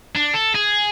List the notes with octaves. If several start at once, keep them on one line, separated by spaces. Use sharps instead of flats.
D4
A4
G#4